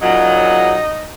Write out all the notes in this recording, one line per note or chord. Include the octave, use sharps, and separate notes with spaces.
A#2 C#3 F#3 D#4